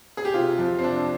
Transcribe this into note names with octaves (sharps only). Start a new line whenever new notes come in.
G#4
G4
C3 F4
F2
C4
C3 D4